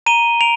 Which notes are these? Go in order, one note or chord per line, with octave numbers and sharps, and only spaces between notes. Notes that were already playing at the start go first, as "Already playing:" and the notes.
A#5 D#7 G7
A#5 D7 F7